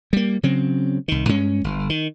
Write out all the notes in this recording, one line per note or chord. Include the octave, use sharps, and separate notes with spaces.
G3 A#3
C#3 F#3 C4
C2 D#3
G2 G#3 C#4
G1
D#3